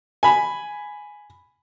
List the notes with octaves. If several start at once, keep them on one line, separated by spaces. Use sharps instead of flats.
G#5 B5